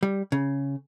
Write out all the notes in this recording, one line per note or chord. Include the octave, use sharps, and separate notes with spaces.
G3
C#3